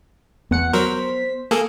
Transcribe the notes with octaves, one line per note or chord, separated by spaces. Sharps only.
E2 B3 F#5 C#7
F#3 A#4 C5 B6
A#3 G#4 A4